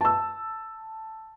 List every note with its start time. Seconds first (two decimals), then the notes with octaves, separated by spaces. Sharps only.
0.01 A5 E6